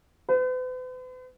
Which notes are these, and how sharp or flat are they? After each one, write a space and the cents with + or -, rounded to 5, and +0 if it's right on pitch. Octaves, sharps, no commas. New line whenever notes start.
B4 +45